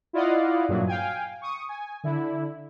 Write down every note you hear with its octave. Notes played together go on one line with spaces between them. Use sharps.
E4 F4 D5 D#5 F5 F#5
G2 A#2 F#3
F5 G5 G#5
C#6 D#6
G#5
D3 E4